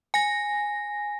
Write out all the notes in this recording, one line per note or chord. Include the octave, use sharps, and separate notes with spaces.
G#5 A#6